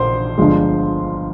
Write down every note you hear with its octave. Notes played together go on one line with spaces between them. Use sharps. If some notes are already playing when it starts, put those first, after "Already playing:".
Already playing: A#1 C5 C6
G1 G2 F3 G#3